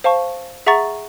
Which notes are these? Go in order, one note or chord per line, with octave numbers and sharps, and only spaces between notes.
C5 F5 A5 C#6
G#4 E5 F#5 A#5 C#6 A6